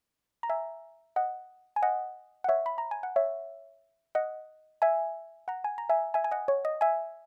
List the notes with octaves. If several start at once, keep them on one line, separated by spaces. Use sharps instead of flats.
A#5
E5 G#5
D#5 F#5
G#5
D#5 F#5
F#5
C#5 E5
B5
A#5
G#5
F#5
C#5 E5
D#5 F#5
E5 G#5
F#5 A#5
G#5
A#5
E5 G#5
E5 G#5
G#5
D#5 F#5
C#5
D#5
E5 G#5